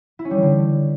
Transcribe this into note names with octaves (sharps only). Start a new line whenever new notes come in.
E4
C#4
G3
E3
D3